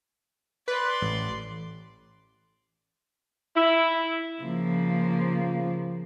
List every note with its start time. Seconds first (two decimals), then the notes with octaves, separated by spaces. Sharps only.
0.68 B4 D5 C6
1.02 A1
3.56 E4
4.42 C#3 F3 A#3